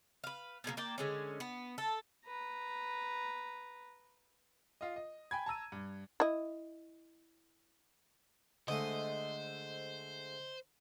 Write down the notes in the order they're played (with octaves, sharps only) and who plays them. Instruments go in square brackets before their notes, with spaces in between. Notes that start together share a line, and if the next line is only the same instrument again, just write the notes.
[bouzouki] B4 F5
B2 F#3 G#3 A#3
A#3 D5 G5 A5
D3 G#3 C#4
B3
A4
[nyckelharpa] B4 A#5
[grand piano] F4 D#5
D#5
G5 G#5 B5 G#6
A5 A#5 E6 D#7
G2
[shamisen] E4 D#5
[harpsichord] D3 G#3 A3 [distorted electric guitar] C5 [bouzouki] D#5